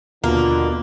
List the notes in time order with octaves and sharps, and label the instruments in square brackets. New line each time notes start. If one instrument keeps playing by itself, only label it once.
[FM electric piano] D#2 [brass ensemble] B2 D3 [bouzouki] A#3 [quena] F4